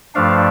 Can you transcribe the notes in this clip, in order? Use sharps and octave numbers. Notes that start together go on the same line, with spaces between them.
G2 F3 A3 D4 F5